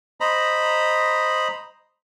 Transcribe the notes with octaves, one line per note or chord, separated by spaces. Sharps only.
C5 D#5 A#5 B5